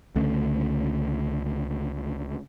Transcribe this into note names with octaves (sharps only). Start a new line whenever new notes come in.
C#2 D3 A3 C#4